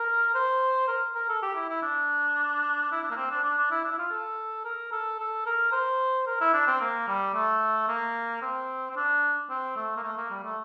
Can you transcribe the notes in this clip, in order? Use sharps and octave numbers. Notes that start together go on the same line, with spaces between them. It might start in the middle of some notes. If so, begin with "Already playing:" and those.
Already playing: A#4
C5
A#4
A#4
A4
G4
E4
E4
D4
E4
D4
A#3
C4
D4
D4
D4
E4
D4
E4
F4
A4
A#4
A4
A4
A#4
C5
A#4
E4
D4
C4
A#3
G3
A3
A#3
C4
C4
D4
C4
A3
A#3
A3
A#3
G3
A3